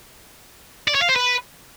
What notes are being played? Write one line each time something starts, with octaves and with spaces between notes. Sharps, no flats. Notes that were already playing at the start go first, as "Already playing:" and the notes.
D5
C#5
F5
C5
B4